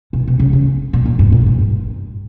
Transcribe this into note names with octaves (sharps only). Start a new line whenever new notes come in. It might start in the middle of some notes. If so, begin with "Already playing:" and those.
B2
B2
C#3
C#3
A#2
A#2
G2
A#2
A#2
G2